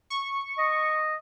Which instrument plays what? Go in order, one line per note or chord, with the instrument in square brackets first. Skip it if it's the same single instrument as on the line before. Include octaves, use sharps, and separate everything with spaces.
[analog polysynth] C#6
[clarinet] D#5